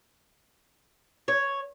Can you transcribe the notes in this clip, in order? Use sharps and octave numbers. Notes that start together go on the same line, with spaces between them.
C#5